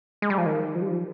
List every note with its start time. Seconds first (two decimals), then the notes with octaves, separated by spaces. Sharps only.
0.22 G#3
0.30 G3
0.38 F3
0.46 D#3
0.75 F3
0.82 G3
0.88 F3